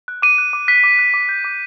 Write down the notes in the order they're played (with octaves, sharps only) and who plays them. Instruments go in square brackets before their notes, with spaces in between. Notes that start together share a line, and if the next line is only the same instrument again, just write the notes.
[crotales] F#6
D6 D#7
F#6
D6
F#6 B6
D6
F#6
D6
G6
D6